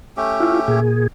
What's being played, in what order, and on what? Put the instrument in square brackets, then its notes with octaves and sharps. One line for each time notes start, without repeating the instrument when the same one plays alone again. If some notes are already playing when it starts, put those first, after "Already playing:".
[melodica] A3 C#4 G4
[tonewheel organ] E4 F4
A#2 G#4